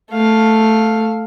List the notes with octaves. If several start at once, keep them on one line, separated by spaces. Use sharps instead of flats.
A3 F5